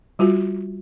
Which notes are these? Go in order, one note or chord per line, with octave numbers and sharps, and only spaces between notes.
G3 F4 F#4